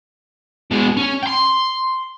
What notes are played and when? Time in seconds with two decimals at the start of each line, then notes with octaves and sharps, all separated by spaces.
0.71 B2 G#3
0.97 C#4
1.23 G5 C6